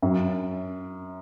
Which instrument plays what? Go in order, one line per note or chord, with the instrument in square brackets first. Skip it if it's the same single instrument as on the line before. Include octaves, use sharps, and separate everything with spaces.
[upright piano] F#2